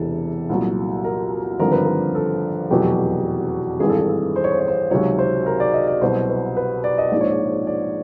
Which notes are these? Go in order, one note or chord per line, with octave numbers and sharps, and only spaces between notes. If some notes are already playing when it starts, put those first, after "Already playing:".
Already playing: E1 E2 C3 E3 A4
C2 A#2 F#3
A#4
G#1 G2 D3 F3 A#4
B4
A#4
A4
F1 E2 B2 F#3 G4
G#1 G2 E3 G#4
A4
G#4
A4
C5
C#5
C5
C#5
C5
C#2 C3 D#3 F#3 C#5
C5
A#4
D5
D#5
D5
C2 B2 F#3 C5
B4
B4
D5
D#5
A#1 G#2 F3 D5
C#5
D5
D5